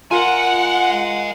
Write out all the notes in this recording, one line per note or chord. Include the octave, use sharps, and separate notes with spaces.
F4 A#4 D#5 F#5 G#5